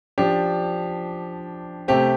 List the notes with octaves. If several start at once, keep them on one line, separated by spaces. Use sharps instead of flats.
F3 D4 G4
C3 A3 C4 G4